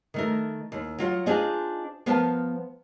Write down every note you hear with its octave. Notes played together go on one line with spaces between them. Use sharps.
D#3 A3 A#4
D#2
F#3 F4 F#5
D4 D#4 F4 G#4 C5 D#5
F3 B3 A#4 F5 G5 A5